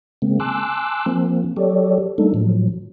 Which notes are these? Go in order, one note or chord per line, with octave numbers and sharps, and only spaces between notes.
C#3 G#3 A#3 C4
G#5 A5 C6 D6 E6 F#6
F3 A#3 C4
F#3 G4 A4 C#5 D5
G3 A3 A#3 D4 D#4 A4
A2 F3 F#3